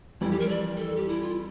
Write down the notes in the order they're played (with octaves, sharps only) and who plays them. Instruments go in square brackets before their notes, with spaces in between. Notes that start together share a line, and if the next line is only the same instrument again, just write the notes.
[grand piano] F2 E3 G3 [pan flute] E4
[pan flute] G4
A#4
D5
A4
G4
E4
F4